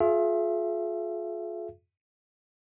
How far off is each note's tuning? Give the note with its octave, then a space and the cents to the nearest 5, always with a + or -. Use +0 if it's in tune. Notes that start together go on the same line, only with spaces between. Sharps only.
F4 +25 G#4 +45 E5 +30